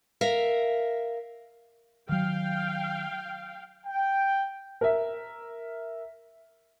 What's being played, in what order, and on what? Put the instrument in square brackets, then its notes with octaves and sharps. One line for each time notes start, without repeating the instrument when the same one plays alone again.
[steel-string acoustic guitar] A#4 E5 F5
[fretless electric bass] D#3 F#3 [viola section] F5 G5
[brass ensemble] G5
[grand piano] A#4 E5